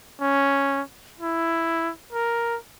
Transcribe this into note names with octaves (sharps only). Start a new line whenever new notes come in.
C#4
E4
A#4